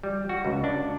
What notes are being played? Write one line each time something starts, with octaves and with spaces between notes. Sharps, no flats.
G3
F#4
C#2
D4